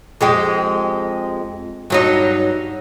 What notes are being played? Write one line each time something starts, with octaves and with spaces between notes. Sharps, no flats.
F2 G#3 G4
G2 F#3 D#4